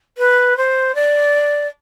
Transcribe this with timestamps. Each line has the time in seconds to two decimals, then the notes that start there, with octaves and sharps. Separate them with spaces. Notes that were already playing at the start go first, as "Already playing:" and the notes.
0.18 B4
0.57 C5
0.95 D5